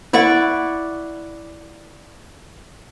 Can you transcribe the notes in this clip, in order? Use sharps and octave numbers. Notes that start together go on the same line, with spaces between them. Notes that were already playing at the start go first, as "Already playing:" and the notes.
E4 D5 F#5 C#6